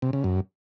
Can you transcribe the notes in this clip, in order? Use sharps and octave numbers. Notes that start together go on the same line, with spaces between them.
C3
C#3
F#2